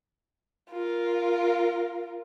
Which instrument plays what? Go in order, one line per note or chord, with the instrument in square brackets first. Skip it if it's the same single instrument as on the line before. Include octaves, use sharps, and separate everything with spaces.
[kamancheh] F4 A#4